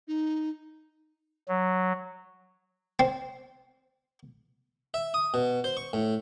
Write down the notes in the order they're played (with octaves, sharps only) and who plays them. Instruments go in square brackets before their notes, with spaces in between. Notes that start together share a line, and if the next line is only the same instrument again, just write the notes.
[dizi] D#4
[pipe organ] F#3
[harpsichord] C4
E5
D#6
B2
C5
C#6
A2